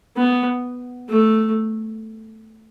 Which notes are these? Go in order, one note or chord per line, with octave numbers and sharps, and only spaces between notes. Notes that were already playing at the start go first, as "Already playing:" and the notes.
B3
A3